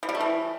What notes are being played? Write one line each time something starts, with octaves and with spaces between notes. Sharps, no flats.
E3
G3
A3
E3